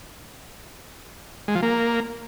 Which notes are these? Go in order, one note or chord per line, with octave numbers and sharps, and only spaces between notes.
G#3
F3
A#3